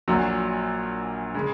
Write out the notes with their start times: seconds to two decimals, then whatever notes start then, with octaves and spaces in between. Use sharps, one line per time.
0.08 A#1 A#2 F#3
1.34 C#3 G#3